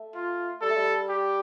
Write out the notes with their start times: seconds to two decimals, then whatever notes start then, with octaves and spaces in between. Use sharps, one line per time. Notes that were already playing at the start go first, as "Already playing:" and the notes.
Already playing: A3
0.15 F4
0.62 G3 A4
0.69 A3
0.77 G3
1.09 G4